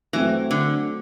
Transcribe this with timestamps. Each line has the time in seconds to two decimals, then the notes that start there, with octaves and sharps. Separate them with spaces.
0.13 E3 F#3 A3 C4
0.51 D3